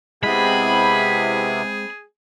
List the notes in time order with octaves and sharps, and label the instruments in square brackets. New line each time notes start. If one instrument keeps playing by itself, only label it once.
[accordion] C3 B3 E4 [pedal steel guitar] G#3 C4 [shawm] G#4 [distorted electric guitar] B5